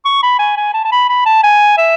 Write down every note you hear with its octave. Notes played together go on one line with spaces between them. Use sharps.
C#6
B5
G#5
G#5
A5
A5
B5
B5
A5
G#5
E5